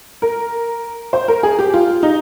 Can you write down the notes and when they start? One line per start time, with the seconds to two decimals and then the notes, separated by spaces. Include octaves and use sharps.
0.22 A#4
1.13 C5
1.28 A#4
1.43 G#4
1.59 G4
1.74 F4
2.03 D#4